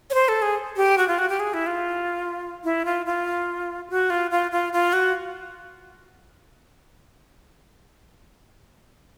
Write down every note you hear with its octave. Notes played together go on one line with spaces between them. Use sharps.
C#5
C5
A4
G#4
G4
F#4
F4
F#4
G4
G#4
E4
F4
E4
F4
F4
F#4
F4
F4
F4
F4
F#4